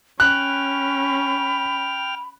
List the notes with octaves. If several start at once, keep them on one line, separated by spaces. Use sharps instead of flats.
C#4 G5 B5 F6 F#6